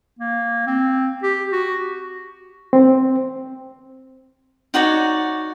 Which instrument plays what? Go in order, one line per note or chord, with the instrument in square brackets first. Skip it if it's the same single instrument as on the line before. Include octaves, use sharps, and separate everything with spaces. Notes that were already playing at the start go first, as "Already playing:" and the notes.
[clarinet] A#3
C4
G4
F#4
[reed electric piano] C4
[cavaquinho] D#4 F#4 C#5 D5